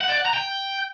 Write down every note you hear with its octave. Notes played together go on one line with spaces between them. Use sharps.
F#5
D5
F#5
A#5
G5